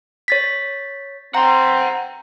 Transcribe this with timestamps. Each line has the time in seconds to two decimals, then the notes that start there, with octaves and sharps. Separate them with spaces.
0.28 C#5 A6 B6
1.34 C4 F#5 A#5 C6